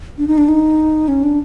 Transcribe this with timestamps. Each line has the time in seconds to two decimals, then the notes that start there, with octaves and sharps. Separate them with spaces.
0.18 D4
0.28 D#4
0.38 D4
0.48 D#4
1.08 C#4
1.23 D4